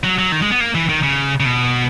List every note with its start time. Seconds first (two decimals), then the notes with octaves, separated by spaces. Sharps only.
0.04 F#3
0.19 F#3
0.32 D#3
0.42 G#3
0.51 B3
0.60 A#3
0.75 E3
0.89 D#3
1.03 C#3
1.40 C#3
1.46 B2